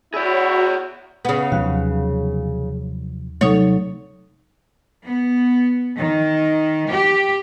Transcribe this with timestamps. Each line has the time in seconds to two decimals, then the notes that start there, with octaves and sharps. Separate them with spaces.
0.14 E4 F#4 G#4 C#5 D5
1.25 C#3 B3
1.52 D#2 C3 F3 F#3 F5 F#6
3.41 C3 F#3 G3 A3 D#4 A4 C#5
5.05 B3
5.99 D#3
6.91 G4